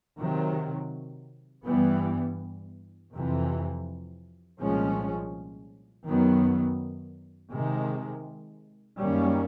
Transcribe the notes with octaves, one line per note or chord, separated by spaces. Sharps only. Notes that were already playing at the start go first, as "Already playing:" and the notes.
C3 D#3 F#3
G2 E3 G3 B3
F2 C3 E3
C2 A#2 F3 G#3 C#4
F#2 D#3 F#3 B3
C3 D#3 G#3
F#2 D#3 G3 A#3 C#4